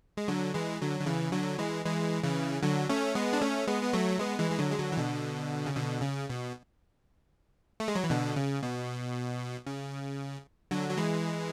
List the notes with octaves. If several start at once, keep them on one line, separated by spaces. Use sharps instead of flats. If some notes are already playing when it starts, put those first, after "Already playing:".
G#3
D3 F#3
E3 G#3
D3 F#3
D3
C#3 E3
D3 F#3
E3 G#3
E3 G#3
C#3 E3
D3 F#3
A3 C#4
G#3 B3
D4
A3 C#4
G#3 B3
B3
F#3 A3
G#3 B3
E3 G#3
G#3
D3 F#3
G#3
D3 F#3
E3
B2 D3
C#3
B2 D3
C#3
B2
A3
G#3
F#3
E3
B2 D3
C#3
B2
C#3
D3 F#3
F#3
E3 G#3